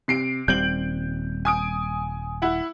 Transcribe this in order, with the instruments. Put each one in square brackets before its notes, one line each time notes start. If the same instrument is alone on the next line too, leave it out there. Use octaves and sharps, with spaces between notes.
[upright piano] C3 C7 D7
[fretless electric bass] D#1 G3 C4 [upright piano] G6 D7 F#7
[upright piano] G#5 D#6 D7
E4 F#5